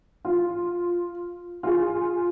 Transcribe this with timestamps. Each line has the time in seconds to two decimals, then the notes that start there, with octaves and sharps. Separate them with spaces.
0.25 F4
1.63 F4 G#4